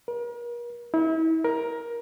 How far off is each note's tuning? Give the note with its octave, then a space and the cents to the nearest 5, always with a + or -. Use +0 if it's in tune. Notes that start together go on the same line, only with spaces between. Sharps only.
A#4 +40
E4 -35
A#4 +15